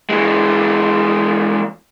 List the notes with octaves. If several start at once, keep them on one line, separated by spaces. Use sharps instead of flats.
E3 G#3